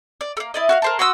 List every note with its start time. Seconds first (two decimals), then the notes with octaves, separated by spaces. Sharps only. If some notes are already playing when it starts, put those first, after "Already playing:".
0.21 D5
0.37 A3 A#3
0.54 E4 D5 D#5
0.69 F#4 A4 F5
0.82 A#4 C5 A5
0.99 F#4 C6 D#6 E6